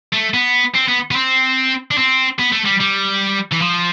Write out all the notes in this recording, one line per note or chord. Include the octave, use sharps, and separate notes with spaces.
A3
B3
C4
B3
B3
C4
D4
C4
B3
A3
G3
G3
E3
F3